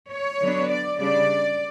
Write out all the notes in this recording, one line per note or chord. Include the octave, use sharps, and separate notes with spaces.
C#5
D3 F#3 B3 D4
D5
C#3 G3 D4 D5